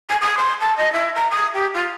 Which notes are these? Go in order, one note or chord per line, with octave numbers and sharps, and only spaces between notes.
G#5
D#6
C6
A5
D#5
E4
A#5
D#6
G4
F4